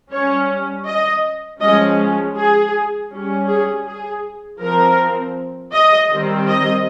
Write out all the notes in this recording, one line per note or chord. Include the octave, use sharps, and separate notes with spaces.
C#4 C#5
G3
D#5
F3 G#3 C#4 D#5
G#4
G3 C#4
G#4
G#4
F3 C4 A#4
D#5
D#3 G3 C4
D#5